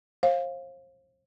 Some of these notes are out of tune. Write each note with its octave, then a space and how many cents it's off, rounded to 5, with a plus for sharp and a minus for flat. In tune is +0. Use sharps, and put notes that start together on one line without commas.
C5 +40 F5 +0